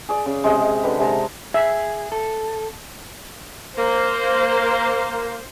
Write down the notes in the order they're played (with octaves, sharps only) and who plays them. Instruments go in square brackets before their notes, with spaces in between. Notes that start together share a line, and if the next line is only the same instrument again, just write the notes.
[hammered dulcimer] G#4 D5
C#3
C3 G#3 D#5
D3 G4 B4
C3 G#3 A5 A#5
[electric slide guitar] G#4 [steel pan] E5
[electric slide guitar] A4
[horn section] A#3 [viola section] C5